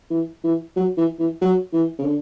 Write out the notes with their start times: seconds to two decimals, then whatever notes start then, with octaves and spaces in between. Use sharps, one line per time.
0.10 E3
0.44 E3
0.76 F#3
0.97 E3
1.19 E3
1.41 F#3
1.73 E3
1.99 C#3
2.05 D3